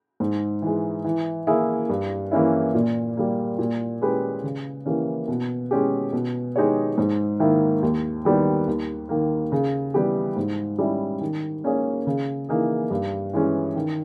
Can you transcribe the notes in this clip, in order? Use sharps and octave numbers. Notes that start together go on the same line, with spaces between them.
G#2
E3 G#3
E3
A#3 E4 G#4
G2
E3 A#3 C#4 E4
A#2
G3 A#3
A#2
G#3 C#4 G4 B4
C#3
E3 A#3 C#4 G4
B2
G#3 C#4 G4
B2
G#3 D#4 G4 C#5
G#2
D#3 A#3 E4
D#2
D#3 G3 B3
D#2
D#3 A#3
C#3
E3 G3 B3 G4
G#2
G3 C#4 E4
D#3
A#3 C#4 G#4 C#5
C#3
E3 A#3 D#4 G#4
G2
E3 G#3 C#4
D#3